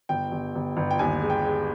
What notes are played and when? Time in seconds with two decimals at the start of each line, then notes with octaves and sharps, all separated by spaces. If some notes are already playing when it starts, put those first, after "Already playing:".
0.09 G1 G5
0.32 G1
0.55 G1
0.77 G1
0.91 G5
0.99 D#2 G#5
1.22 G#3
1.30 G5
1.45 G#3